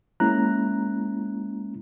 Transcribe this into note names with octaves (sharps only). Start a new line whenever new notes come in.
G#3 A#3 C#4 E4 A#5 F#6